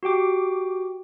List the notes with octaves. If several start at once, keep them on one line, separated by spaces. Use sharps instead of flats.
F#4 G4 G5 D6